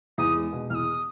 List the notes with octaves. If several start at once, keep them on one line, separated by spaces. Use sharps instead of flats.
E2 D#6
G#3
B2
E2 D#6 F6